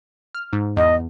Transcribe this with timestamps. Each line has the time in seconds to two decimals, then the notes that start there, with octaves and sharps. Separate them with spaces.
0.35 F6
0.53 G#2
0.77 E2 D#5